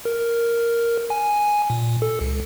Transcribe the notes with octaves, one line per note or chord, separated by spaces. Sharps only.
A#4
G#5
A#2
A4
C#2